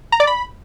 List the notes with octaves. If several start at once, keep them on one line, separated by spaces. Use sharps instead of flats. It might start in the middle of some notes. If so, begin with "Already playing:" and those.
A#5
D5
B5